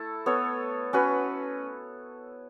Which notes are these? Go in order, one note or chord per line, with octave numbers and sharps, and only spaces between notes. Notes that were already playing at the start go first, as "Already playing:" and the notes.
Already playing: A3 E4 A4
B3 A4 C#5
C#4 F#4 B4